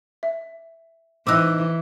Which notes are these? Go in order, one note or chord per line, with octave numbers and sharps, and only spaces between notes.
E5
E3 C4 D#4 D6 E6 F#6